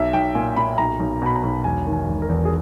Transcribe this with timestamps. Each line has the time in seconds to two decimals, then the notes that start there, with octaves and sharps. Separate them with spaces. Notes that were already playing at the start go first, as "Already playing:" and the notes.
Already playing: B1 E5
0.13 B1 G5
0.35 A#2 G#5
0.56 A#2 B5
0.78 B1 A#5
1.00 B1
1.22 B2 B5
1.36 A#5
1.43 B1
1.64 E1 G#5
1.86 D#3
1.93 G#5
2.08 E1
2.22 A#4
2.29 E2
2.45 G#4